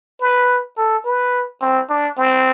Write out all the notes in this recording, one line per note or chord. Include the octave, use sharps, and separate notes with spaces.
B4
A4
B4
C4
D4
C4